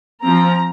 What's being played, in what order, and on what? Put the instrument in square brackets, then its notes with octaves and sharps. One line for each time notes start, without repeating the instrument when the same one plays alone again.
[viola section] F3 C4 A#5